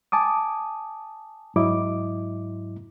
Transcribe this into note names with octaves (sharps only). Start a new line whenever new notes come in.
G#5 A5 D6 D#6
G#2 F#3 E4 D#5 D6